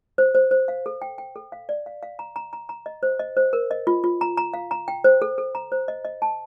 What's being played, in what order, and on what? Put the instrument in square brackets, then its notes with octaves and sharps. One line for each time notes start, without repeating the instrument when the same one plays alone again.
[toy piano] C5
C5
C5
F5
A4
G5
G5
A4
F5
D5
F5
F5
A#5
A#5
A#5
A#5
D#5
C5
D#5
C5
A#4
D#5
F4
F4
A#5
A#5
F5
A#5
G5
C5
A4
A4
A#5
C5
D#5
D#5
A5